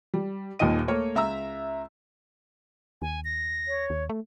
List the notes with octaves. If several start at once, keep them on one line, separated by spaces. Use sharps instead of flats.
G3
D#1 D#2 A#2 D#3 D#5 D#7
A3 A#3 C#5
C#2 E5 A#5 E6
D#2 G#5
A#6
C#5
D#2
A3